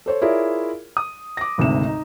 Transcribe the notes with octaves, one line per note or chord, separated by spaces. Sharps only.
A4 C5 C#5
E4 F4 G#4 A#4 C#5 D5
D#6
D6 A#6
G#1 D2 G#2 C3 E7
D#4